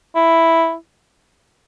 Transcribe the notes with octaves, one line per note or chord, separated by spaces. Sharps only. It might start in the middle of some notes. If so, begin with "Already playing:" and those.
E4